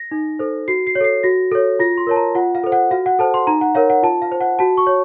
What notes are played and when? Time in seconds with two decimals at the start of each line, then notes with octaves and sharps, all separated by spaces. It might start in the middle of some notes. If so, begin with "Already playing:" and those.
Already playing: A#6
0.11 D#4
0.39 A4 C5
0.68 F#4 C7
0.87 C7
0.95 C#5
1.00 A4 C7
1.23 F#4 A#6
1.51 A4 C#5
1.79 F4 A#6
1.98 C6
2.07 A#4 C#5 A5
2.16 A#5
2.35 F4 F#5
2.55 F5
2.63 A4 C5
2.72 F#5
2.91 F#4 F5
3.06 F#5
3.19 A4 C5 A5
3.34 C6
3.47 D#4 A#5
3.61 F#5
3.75 A#4 C#5 F5
3.90 F#5
4.03 F4 A5
4.22 F5
4.32 C5
4.41 F#5
4.59 F#4 A5
4.78 C#6
4.87 C#5